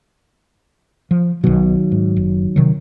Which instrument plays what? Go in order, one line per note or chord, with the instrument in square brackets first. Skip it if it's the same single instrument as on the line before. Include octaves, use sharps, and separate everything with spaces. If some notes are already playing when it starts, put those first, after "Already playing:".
[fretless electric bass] F3
[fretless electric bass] B1 B2 [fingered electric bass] D#3 F#3
[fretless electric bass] G#2
F#1
C3 D#3 F#3